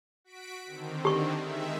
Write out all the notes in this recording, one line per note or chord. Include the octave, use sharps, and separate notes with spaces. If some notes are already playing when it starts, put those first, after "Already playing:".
F#4 B6 D7
D3 D#3 C4
G4 C#6
D#3 G#3 E5